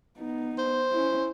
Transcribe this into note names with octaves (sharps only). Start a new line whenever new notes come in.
B3 D#4
C5
C#4 E4